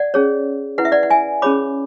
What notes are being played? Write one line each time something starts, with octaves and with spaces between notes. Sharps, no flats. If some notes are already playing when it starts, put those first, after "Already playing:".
Already playing: D5 F#5
C#4 G#4 C#5
E4 B4 F#5
E5
D5 F#5
F#5
E5 G#5
C#4 G#4 C#5 B5 D6